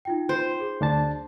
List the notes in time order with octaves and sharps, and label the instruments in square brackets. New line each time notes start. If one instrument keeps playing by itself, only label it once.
[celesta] D#4 F4 G5
[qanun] C5
[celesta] G#4
[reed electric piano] D2 D4 A5